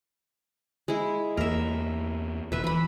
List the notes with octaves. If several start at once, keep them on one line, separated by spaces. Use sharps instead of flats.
G#3 E4
E2 A#3 A#4 E5
E1 B4 E5
E3 B4 B5